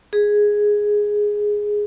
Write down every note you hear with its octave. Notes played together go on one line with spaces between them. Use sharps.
G#4